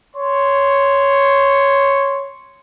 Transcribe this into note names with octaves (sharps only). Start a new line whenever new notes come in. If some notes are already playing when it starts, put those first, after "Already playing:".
C#5 C6